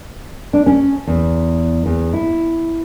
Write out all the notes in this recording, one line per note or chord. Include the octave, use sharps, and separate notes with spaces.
D4
C#4
E2
E2
E4